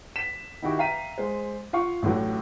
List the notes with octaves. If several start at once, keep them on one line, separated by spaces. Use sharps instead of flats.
B6 E7
D#3 D#4 E4 F#4 G4
E5 F5 G5 A#5 B6 D#7
G#3 C5
F4 F5 F#5 C#6
A1 A2 D3 F#3